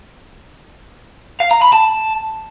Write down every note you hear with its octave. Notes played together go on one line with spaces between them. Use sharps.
F5
A#5
B5
A5